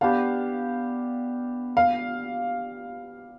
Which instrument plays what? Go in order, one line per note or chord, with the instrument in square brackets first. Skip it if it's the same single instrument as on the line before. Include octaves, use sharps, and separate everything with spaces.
[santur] B3 D4 G4 [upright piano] F5
[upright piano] F5